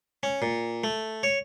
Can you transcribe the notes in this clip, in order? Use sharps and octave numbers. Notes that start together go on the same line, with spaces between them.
C#4
A#2
A3
C#5